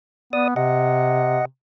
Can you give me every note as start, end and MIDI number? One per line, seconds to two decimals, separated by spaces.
0.33 0.54 59
0.33 0.48 74
0.33 0.48 87
0.56 1.43 48
0.56 1.45 75
0.56 1.45 78